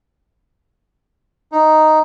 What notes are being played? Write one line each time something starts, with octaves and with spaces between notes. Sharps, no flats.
D#4